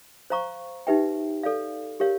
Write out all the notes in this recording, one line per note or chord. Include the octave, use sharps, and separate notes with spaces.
C5 F5 A#5 C#6
D#4 G4 B4 E5 G5
A4 D5 F5
G4 A#4 C#5 F5